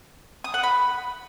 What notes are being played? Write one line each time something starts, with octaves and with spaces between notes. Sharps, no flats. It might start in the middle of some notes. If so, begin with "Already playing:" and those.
D#6
F#5
B5